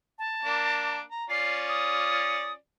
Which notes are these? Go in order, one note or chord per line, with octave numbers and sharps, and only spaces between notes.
A5
A#3 D4
A#5
C#4 F4 D5 C7
D#6